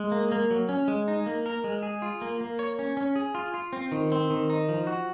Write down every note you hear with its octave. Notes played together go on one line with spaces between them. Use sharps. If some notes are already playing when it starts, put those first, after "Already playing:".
Already playing: G#3
A#3
A#3
F#3
C#4
G#3
D#4
A#3
A#4
G#3
G#4
F4
A#3
A#3
C#5
C#4
C#4
G#4
F4
F4
C4
D#3
C4
D#3
D#4
F3
F#4